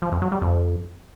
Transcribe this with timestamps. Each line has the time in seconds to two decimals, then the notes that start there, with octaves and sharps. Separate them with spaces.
0.02 F3
0.12 F2
0.22 F#3
0.32 G3
0.42 F2